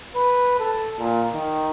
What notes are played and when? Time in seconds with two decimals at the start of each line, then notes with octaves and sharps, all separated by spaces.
0.15 B4
0.59 A4
0.99 A#2
1.33 D#3